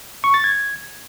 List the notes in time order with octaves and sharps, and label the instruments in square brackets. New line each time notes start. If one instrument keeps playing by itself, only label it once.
[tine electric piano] C#6
A6
G#6